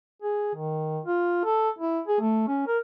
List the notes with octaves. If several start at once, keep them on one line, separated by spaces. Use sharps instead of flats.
G#4
D#3
F4
A4
E4
G#4
A3
C#4
A#4